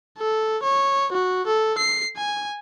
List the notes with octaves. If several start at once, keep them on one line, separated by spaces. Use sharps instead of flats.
A4
C#5
F#4
A4
C7
G#5